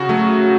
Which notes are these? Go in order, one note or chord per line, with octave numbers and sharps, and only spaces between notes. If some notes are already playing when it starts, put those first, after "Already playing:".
Already playing: C#3 F#4
F#3 A3